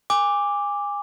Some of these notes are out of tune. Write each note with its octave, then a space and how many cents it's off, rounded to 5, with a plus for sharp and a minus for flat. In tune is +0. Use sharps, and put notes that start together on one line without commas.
G#5 -30 D6 +0